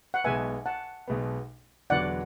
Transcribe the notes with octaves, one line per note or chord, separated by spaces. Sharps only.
F#5
B1 B2 G#3 B3 E5 G#5
F#5 A5
B1 B2 G#3 B3
E1 E2 D3 F#3 B3 D5 F#5